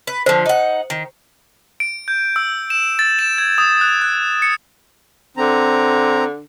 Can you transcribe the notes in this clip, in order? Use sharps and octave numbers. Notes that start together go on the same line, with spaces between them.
B4
D3 F3 C5
D#4 F#5
D#3
D7
G6
E6
E7
A6
E7
G#6
D#6
F#6
F#6
C#7
D3 C4 A#5